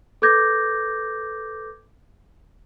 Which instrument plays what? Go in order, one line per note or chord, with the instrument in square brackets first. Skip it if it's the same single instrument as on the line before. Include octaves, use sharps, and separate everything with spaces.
[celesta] A4 B4 D6 G6 G#6 A#6